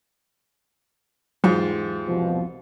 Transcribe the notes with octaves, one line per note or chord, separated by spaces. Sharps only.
E2 G#2 F#3 F4 G4
C2 B2 F3